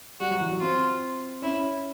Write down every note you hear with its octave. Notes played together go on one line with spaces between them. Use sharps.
G3 F#4
F#3
E3
F#3
C4 F4
C#4 E4